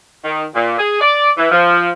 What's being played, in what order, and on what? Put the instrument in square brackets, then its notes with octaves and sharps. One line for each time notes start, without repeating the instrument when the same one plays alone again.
[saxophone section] D#3
A#2
G#4
D5
E3
F3